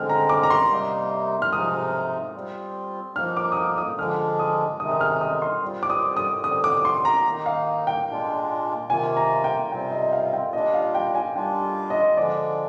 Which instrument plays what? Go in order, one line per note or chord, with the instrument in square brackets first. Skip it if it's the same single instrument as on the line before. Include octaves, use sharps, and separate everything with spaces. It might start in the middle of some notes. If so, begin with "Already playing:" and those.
Already playing: [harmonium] D3 G#3 C4 [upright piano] F6
[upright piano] A#5
D6
A#5
C6
[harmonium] C3 G3 A#3 D#4
[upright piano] F6
[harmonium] C3 F3 G#3 D#4 [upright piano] D#6
[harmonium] G3 C4 F4
[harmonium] F3 A#3 D#4 [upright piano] F6
[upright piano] D6
D#6
D6
D#6
[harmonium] D3 F3 G#3 D4 [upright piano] F6
[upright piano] D#6
[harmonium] C3 D#3 G#3 D#4 [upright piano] D#6
[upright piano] D#6
F6
D#6
C6
[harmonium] G3 C4 F4
[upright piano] D6
D#6
D#6
[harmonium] D3 G3 C4 [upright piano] D#6
[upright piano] D6
C6
A#5
[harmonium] D#3 A#3 D#4
[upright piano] F5
G5
[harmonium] A#2 G#3 D4 F4
[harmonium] C3 D#3 A#3 F4 [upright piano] G#5
[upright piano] A#5
G5
[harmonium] C3 G3 C4 F4 [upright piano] G5
[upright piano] D#5
F5
G5
[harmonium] A#2 G3 D4 F4 [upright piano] D#5
[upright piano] F5
G5
G#5
[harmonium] G3 D4 F4 [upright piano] G5
[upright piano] D#5
[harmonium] D3 F3 G#3 D4 [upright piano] D5